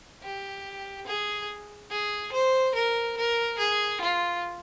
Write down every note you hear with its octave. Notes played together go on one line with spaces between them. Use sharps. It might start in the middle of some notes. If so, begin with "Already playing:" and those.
G4
G#4
G#4
C5
A#4
A#4
G#4
F4